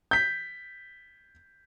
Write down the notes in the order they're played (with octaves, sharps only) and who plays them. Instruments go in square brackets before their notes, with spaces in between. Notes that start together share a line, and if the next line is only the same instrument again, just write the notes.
[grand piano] G6 B6